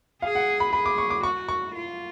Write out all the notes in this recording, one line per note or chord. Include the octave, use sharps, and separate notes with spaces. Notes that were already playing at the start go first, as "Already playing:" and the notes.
G#4 F5
F#5
B5
G#4 B5
D6
C#6
D6
F#4 C#6
C#6
F4